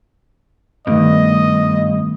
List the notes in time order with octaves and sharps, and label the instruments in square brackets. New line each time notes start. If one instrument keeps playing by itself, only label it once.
[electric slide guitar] G2 [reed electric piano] D#3 A3 B3 [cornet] D#5